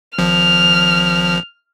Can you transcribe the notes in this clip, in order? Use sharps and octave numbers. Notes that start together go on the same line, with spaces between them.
G#1 F3 F6